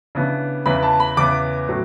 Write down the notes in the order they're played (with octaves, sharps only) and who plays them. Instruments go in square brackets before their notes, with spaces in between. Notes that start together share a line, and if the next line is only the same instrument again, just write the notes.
[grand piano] C#3 E3 B3 D4
E2 C#3 E3 B3 B5
A5
B5
E2 C#3 E3 B3 D6
A2 F#3